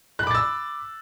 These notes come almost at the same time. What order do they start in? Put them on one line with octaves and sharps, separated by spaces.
F#6 B5 D6 A6 E6